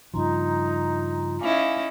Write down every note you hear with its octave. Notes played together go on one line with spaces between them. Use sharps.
G2 C#3 F3 D#4 F4 A#5 C6
C#4 D#4 E4 F5 G#5 D6